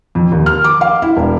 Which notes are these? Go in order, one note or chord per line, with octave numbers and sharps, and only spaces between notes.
F2
D#2
F6
D6
F5
E4
E1